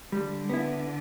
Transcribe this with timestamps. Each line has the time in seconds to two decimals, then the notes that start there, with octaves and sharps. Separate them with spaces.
0.12 D3 G3
0.49 B3 E4